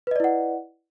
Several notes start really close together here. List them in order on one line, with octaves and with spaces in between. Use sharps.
B4 D#5 D5 E4 F#5